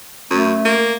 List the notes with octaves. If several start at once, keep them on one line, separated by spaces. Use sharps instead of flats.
F#2 A3
A#3